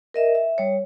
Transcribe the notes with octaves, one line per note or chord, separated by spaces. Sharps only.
A#4 D#5 E5
E5
G3 C#5